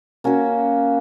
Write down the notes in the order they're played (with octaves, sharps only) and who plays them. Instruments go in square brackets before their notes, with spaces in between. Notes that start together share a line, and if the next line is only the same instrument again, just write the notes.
[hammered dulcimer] A#3 C#4 F#4 A#4